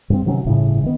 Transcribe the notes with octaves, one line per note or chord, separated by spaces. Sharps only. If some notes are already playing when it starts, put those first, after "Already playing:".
G2 C4
C3 D#3 F#3 C#4
G1 A2 C#3
D#3 B3